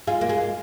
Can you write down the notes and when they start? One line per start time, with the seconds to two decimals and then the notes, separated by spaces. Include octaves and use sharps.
0.07 G#3 F4
0.21 A#3
0.29 G#3